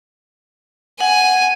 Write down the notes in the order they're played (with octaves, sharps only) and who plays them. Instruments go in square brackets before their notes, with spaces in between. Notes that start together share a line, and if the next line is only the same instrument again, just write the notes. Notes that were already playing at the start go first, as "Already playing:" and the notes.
[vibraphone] F#5 [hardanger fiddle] G#5